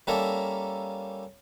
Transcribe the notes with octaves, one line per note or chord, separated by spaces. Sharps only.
G3 A#3 C#4 A4 E5 A#5